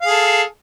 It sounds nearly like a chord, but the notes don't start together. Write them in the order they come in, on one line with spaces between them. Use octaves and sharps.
F5 G#4 A4